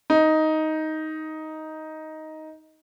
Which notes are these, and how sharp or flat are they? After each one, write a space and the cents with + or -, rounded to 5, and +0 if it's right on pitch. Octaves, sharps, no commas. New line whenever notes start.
D#4 +10